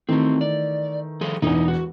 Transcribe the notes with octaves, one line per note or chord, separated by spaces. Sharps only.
D#3 E3 A3 C4 F#4
D5
F3 G#4 A4
E1 E2 D#4 E4
F#4